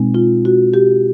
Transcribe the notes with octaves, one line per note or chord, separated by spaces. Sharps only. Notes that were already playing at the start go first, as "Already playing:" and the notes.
Already playing: B2 G#3 C4 D#4
F4
F#4
G4